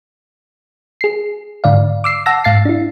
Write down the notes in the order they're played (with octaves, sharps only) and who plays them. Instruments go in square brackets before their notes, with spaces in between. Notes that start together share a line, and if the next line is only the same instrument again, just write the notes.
[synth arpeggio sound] G#4 C7
G#2 D3 D5 F5
D6 E6 C7
F#5 A5 E6 A#6
G#2 F5 A6 C7
D4 E4